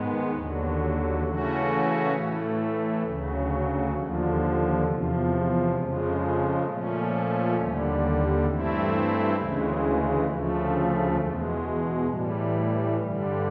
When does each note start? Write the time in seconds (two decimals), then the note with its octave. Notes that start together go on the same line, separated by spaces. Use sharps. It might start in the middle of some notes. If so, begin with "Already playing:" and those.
Already playing: G#2 D#3 G#3 B3
0.31 D#2 D3 F#3
1.23 C#3 E3 A3 C#4 F#4
2.13 A2 E3 A3
3.03 D2 C#3 F#3
3.94 D#2 D3 F3
4.84 E2 C3 F3
5.74 F2 C#3 F3 G#3
6.64 A#2 F3 A3 C#4
7.56 D#2 D3 G3
8.45 G2 E3 A3 C4 E4
9.35 D2 C#3 E3 G#3
10.26 D2 C#3 F3 A3
11.17 E2 B2 G#3
12.06 A2 E3 G3
12.98 G2 D3 G3